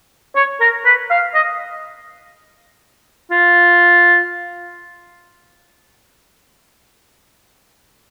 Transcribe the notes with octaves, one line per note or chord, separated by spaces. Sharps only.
C#5
A#4
B4
F5
D#5
F4